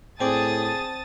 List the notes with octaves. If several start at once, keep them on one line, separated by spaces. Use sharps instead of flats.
A2 C4 G#4 D5 A5 D#6 A6